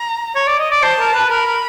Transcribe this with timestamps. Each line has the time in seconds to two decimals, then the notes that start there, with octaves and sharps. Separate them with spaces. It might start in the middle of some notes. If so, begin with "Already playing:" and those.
Already playing: A#5
0.35 C#5
0.47 D5
0.59 D#5
0.71 D5
0.82 C5 A5
0.99 A#4
1.14 B4
1.30 A#4 B5
1.46 A#4